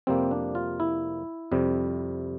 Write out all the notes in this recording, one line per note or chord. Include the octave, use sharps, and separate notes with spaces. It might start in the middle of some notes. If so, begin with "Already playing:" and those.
F2 C3 G3 A#3 C4
D4
F4
E4
F2 C3 G3